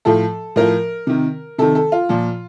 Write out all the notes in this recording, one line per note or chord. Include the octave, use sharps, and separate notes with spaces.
A2 F3 A4
A2 F3 A#4
C3 D#3
C3 D#3 A4
A4
F4
A#2 F3